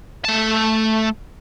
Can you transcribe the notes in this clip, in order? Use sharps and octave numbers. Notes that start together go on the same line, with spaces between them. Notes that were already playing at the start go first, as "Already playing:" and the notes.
A3 A5